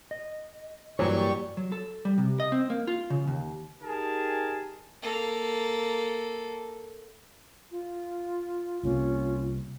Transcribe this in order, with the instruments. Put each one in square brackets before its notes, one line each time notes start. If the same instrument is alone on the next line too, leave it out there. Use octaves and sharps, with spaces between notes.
[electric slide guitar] D#5
[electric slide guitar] G2 A#3 [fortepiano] E3 F#3 [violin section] G4 D5 C#6 [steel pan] C#5
[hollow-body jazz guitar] F#3
A4
G3
C3
D#5
C4
A#3
F4
C#3
D#2
[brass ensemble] D#4 G4 G#4 A#4 A5
[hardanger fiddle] A#3 A4
[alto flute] F4
[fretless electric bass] C2 C3 A#3 [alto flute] C#4 [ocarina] F4